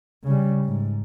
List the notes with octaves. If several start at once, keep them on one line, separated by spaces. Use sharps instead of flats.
C#3 G3
G#2